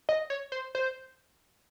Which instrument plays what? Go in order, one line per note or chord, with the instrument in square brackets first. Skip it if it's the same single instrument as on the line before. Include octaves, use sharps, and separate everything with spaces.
[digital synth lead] D#5
C#5
C5
C5